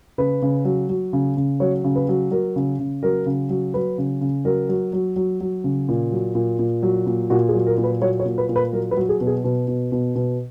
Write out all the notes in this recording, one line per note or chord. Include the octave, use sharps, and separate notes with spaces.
C#3 B4
C#3
F#3
F#3
C#3
C#3
F#3 C#5
C#3
B4
F#3
F#3 A#4
C#3
C#3
F#3 A#4
C#3
F#3
F#3 B4
C#3
C#3
F#3 A#4
F#3
F#3
F#3
F#3
C#3
A#2
F#3
A#2
A#2
F#3
A#2
A#2 F#4
G#4
F#3
A#4
A#2
B4
F#3 C#5
C#5
A#2
B4
A#2
B4
F#3 A#4
B4
F#3
G#4
B2
G#4
B2
B2
B2
B2